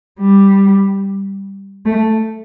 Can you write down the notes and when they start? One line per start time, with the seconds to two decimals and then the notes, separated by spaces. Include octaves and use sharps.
0.20 G3
1.86 A3